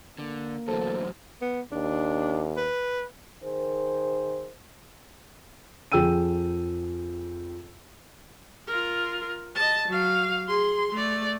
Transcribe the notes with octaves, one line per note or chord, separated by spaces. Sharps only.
D3 A#3
E2 A2 D3 F#3 A4 C5
B3
D#2 D4
B4
D#3 G#4 A#4 C5
F2 G#4 G5 E6 D#7
F4 A#4
D#5 A5
F#3 F5
G#4 C6
A3 D5